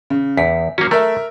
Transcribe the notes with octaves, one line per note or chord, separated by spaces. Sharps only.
C#3
E2 B6
F#3 A#3 C#4
A3 A#4 E5